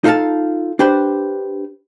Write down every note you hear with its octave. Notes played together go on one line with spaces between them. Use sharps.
D#4 F4 A4 E5 F5 A5
D4 G4 B4 C5